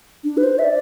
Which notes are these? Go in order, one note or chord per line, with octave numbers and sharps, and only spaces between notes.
D4
B4
C5
E5
D5